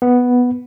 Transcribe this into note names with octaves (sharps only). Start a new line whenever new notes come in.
B3